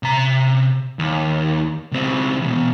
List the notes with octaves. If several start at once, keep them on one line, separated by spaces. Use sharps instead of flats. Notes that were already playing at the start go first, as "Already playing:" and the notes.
C3 A#5
D#2
C#2 C4
E2 B2